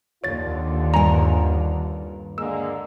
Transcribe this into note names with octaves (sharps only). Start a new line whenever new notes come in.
D#2 D3 F4 C#5 A6
G2 A#4 G#5 A#5
D3 G#3 A#3 E6